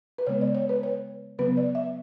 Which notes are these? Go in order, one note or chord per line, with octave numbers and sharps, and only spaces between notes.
B4
C#3 G#3 B3 C#5
D5
C#5
B4
C#5
C#3 F#3 B3 B4
D5
E5